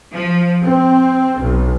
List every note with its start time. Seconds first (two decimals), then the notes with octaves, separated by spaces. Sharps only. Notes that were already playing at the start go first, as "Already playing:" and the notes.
0.12 F3
0.64 C4
1.40 B1